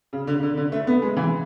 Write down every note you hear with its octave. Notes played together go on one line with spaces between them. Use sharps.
C#3
D3
D3
D3
A3
B3
G#3
E3